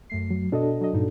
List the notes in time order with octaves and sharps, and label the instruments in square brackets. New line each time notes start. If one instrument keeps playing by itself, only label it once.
[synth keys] F#2 A3 C7
[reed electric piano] F#3
[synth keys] B2 D#5 [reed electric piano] D4 F#4 A4
[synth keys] F#3 D#5
G2 A#2 D#4